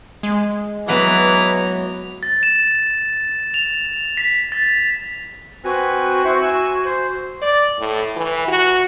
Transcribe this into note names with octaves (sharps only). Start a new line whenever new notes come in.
G#3
E3 F#3 B3 B4 F#5 A#5
A6
E7
F7
B6
A6
C4 F#4 B4 G#5
E4 C5 C#6
G#5 E6
C5
D5
A2
E3
F#4